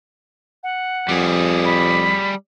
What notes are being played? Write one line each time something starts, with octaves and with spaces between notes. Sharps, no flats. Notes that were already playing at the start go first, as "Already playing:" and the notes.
F#5
F2 G3 G#4
B5